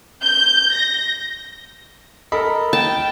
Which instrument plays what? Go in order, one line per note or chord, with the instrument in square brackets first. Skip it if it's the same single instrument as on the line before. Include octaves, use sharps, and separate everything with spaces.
[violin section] G6
A#6
[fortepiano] A4 A#4 [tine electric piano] D#5 B5
[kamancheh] G5 [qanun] A5